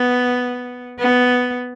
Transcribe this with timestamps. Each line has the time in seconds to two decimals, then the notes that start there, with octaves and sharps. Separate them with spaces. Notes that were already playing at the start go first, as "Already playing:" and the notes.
Already playing: B3
0.99 B3